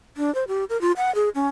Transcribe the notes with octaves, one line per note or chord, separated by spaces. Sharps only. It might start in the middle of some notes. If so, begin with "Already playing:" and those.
D4
C5
G4
A#4
F4
F#5
G#4
C#4